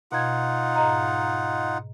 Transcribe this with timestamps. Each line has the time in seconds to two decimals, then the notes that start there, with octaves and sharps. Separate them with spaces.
0.12 B2 D#4 F4 F#5 G#6
0.75 G#2 D#5 A#5